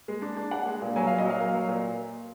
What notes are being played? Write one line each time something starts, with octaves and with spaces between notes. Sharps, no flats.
G#3
D4
D4
D4 F#5
G#3
A#2
F#3 G#5
F5
A#2
D#5
F#3 F5
A#3 F5
F#3
A#2